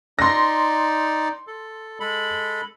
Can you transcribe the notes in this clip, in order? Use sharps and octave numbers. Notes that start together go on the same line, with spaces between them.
D#4 D5 C6 A#6
A4
G#3 A4 B5